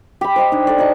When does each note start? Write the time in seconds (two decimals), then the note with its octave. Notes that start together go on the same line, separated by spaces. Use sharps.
0.21 G4 B5
0.36 C5 D#5 G5
0.52 D4 D#4
0.67 A4 D5
0.78 D#4 C5 D#5 C#6